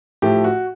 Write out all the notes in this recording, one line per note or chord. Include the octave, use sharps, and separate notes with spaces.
A2 F3 A3 G4
F#4